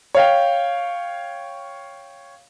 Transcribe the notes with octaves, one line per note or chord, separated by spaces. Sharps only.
C#5 F5 G5